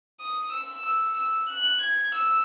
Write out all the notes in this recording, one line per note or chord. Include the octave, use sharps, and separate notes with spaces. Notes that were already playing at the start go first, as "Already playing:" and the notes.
D#6
E6
E6
E6
F#6
G#6
E6